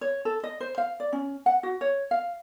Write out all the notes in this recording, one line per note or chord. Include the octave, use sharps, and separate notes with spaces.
C#5
A4
D#5
C5
F5
D5
C#4
F#5
F#4
C#5
F5